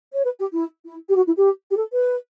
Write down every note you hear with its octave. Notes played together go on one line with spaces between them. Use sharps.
C#5
B4
G4
E4
E4
G4
F#4
E4
G4
G4
A4
B4